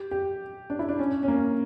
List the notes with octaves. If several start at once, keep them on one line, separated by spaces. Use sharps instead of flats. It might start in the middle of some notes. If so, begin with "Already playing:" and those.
Already playing: G4
G4
D4
E4
D4
C#4
C#4
A#3